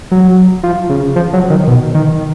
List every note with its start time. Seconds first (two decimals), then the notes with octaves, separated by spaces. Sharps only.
0.12 F#3
0.63 F3
0.90 C#3
1.16 F3
1.33 F#3
1.50 D#3
1.67 B2
1.94 D#3